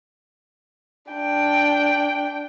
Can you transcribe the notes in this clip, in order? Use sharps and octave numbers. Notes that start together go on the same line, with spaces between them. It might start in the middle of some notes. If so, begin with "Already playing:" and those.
D4 G5